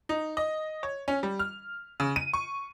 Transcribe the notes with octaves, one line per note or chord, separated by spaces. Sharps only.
D#4
D#5
C#5
C#4
G3
F6
C#3
D#7
C#6